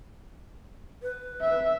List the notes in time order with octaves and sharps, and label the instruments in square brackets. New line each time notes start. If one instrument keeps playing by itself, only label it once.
[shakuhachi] B4
[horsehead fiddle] E5